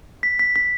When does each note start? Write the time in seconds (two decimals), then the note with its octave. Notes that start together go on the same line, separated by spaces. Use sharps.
0.23 B6
0.39 B6
0.56 B6